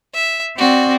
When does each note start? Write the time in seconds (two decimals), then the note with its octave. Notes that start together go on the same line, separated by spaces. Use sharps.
0.14 E5
0.58 C4 F#4 D5